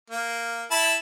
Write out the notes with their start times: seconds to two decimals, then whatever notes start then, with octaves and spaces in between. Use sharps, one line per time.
0.10 A#3
0.71 E4 A5 B5